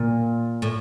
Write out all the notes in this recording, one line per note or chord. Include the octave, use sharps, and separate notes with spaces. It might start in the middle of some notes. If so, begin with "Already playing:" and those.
Already playing: A#2
A2